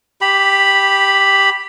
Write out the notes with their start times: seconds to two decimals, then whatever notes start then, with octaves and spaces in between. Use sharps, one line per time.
0.21 G4 B5